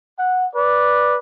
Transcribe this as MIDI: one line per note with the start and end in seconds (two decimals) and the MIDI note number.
0.20 0.46 78
0.56 1.18 71
0.56 1.18 74